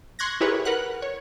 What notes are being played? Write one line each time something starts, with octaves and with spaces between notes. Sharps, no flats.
C6 C#6 F#6 G#6 A#6
E4 G4 G#4 A#4 B4 C#5
A#4 B4 F#5 F#6
C#5